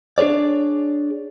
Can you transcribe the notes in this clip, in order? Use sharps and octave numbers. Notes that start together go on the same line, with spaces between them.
D4 G#4 B4 C#5 D5